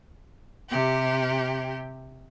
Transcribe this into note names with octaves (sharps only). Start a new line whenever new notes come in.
C3 G4